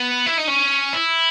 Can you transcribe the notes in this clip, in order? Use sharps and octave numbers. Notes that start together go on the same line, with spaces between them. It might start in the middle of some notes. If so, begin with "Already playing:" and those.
Already playing: B3
E4
D#4
C#4
E4